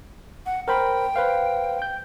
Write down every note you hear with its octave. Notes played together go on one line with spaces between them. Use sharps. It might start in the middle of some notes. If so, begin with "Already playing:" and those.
F#5
A#4 C5 G5 B5
B4 C5 F5
G6